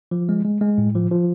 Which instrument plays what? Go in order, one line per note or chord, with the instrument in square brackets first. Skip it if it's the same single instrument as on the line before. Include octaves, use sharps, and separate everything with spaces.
[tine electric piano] F3
G#3
G#3
G#3
A2
F3
F3